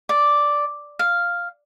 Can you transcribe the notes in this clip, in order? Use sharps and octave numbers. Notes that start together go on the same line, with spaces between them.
D5
F5